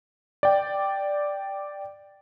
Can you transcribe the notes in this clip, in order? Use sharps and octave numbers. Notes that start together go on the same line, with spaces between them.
D5 G5